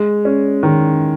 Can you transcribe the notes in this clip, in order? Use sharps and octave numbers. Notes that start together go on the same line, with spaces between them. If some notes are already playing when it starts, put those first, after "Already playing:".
Already playing: G#3
C#4
D#3